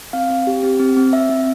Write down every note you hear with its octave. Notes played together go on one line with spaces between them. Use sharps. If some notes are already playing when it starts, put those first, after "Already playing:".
C4 F5
C4
G4
C4
C4
C4
C4 E5
C4